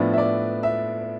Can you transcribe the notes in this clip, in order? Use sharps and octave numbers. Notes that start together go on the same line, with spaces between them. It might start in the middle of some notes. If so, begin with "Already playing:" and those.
Already playing: A2 F3 B3 D4 E5
E5
D5
E5